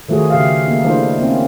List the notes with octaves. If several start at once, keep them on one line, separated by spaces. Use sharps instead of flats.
D#3 F3 A3 F4 F#4 G#4
C#3 G4 F5
A#3 D#4
F3 G#3 A3 D4 E4 C5
F3 A#3 C4 C#4